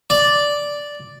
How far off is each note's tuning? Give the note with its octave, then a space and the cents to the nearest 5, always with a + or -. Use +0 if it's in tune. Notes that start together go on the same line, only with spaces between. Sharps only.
D5 -5